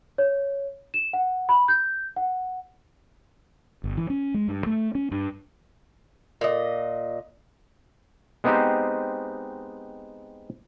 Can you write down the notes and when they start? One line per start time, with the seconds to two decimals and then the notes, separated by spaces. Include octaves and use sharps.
0.18 C#5
0.94 E7
1.13 F#5
1.49 B5
1.68 G6
2.16 F#5
3.84 G1
3.97 E3
4.10 C#4
4.34 G#3
4.48 G2
4.66 A3
4.95 C#4
5.12 G2
6.41 A#2 D#5
8.44 G#3 B3 C4 D#4 G4 C5